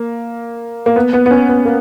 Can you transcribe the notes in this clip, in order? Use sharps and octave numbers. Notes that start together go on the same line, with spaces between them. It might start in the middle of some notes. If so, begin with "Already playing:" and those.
Already playing: A#3
A#3
B3
B3
B3
C#4
B3
A#3